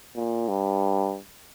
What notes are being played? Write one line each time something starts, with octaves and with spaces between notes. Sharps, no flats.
A#2
G2